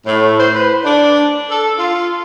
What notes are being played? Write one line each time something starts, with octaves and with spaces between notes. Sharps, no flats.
A2
C5
B4
D4
A4
F4